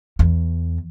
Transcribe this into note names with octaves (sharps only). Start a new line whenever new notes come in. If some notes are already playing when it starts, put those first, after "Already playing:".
E2